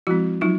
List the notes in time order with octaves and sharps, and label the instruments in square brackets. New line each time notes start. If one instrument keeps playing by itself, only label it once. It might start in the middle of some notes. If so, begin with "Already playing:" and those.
[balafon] F3 G#3 C4 E4 F#4
F#3 D#4 F4